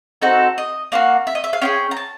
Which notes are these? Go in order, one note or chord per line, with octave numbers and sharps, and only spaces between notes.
C4 D#4 F#4 A4
D#5
A#3 D4 F#4 F5
E5
D#5
E5
F5
C#4 F4 G#4 G5
A#5
A5